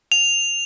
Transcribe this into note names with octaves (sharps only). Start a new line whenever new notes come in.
F7